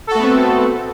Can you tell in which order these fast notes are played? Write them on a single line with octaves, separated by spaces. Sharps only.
A4 F#4 A3 B3 C4